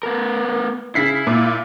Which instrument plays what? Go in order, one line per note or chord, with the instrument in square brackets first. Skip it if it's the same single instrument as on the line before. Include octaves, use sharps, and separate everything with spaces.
[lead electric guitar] B3 A#4
[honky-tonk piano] C#3 B6 C7 [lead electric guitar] E4
[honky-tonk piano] A#2